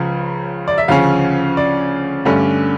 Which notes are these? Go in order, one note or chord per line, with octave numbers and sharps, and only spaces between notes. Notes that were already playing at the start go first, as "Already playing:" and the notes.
Already playing: C#2 C#3 F3
D5
E5
D2 C#3 F3 C#4 F5
D5
G2 D3 A3 C#4